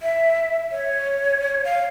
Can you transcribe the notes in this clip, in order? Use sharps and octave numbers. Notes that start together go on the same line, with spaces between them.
E5
C#5
F5